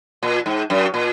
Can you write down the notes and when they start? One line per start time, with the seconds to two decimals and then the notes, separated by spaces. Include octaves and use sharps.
0.23 A#2
0.46 G#2
0.70 F#2
0.94 A#2